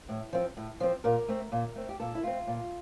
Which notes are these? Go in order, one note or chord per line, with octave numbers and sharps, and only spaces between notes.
A2
F3 C4
A2
F3 C4
A#2 A#4
A3 C4
A#2
A3 C4
G4
A#2 A4
E4
A3 C4 F4
A#2